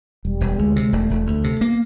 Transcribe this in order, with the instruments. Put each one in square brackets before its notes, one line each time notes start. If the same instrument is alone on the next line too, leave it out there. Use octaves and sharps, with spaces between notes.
[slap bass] E1 [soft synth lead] G3
[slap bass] E1
[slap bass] D2 [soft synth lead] G#3
[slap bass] C3
[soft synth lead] G#3
[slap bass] E1 [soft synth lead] A3
[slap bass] E1
[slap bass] D2 [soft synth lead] A3
[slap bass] C3
[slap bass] A#3 [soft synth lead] B3